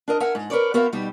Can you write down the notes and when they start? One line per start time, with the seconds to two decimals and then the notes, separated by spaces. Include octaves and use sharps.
0.08 D4 A#4 D#5
0.20 A#4 E5 F#5 G#5
0.35 G#2
0.50 A#4 B4 C#5 D5
0.74 B3 F#4 A#4 C5 E5 F5
0.92 B2 G3 D#4 G4